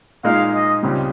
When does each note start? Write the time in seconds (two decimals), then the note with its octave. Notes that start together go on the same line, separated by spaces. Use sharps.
0.24 A#2 G#3 D#4 F5
0.53 D#5
0.83 C#2 C#3 G3 C4